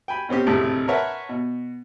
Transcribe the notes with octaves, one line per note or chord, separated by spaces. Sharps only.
G5 G#5 B5
B2 C4 C#4 G4
G#1 D2 A2 C3
A#4 B4 C#5 E5 F#5 A5
B2